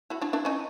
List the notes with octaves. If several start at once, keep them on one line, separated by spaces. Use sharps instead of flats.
E4 F#4
D4 E4
D4 E4
C#4 D#4